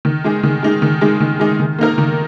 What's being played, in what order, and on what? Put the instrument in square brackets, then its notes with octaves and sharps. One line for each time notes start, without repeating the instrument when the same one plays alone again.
[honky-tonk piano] D#3
G#3 D#4 G#4
D#3
G#3 D#4 G#4
D#3
G#3 D#4 G#4
D#3
G#3 D#4 G#4
D#3
A#3 D#4 A#4
D#3